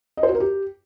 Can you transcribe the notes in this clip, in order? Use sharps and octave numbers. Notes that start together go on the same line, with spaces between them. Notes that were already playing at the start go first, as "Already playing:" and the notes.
D#5
C5
F#4
A#4
G4